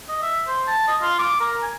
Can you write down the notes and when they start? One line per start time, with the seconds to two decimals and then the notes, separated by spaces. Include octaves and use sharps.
0.09 D#5
0.22 E5
0.47 C5
0.67 A5
0.88 D#5
1.02 F4
1.19 D6
1.40 A#4
1.63 G#5